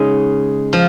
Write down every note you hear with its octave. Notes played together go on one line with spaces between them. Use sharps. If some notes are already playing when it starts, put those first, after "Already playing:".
Already playing: C#3 G#3 D#4
F3